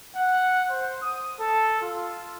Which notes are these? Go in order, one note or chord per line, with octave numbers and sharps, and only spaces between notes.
F#5
C5
D#6
A4
F4